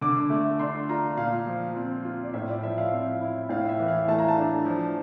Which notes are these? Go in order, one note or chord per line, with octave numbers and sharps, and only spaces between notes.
D3 D6
A3
D4 C6
F4 A#5
A#2 F5
F3
C4
F4
D5
A2 E5
D5
F3 E5
F5
C4
E4
A2 F5
E5
E3
F5
A3 A5
A#5
A5
D4
F3